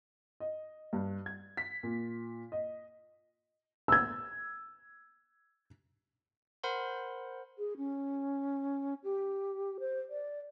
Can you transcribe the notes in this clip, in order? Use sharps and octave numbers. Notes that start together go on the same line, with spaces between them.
D#5
G2
G#6
B6
A#2
D#5
E6 G#6
A#4 C5 F#5 B5 C6
G#4
C#4
G4
C5
D5